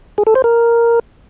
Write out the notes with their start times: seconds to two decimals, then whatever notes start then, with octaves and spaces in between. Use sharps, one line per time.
0.18 G#4
0.27 A4
0.35 C5
0.44 A#4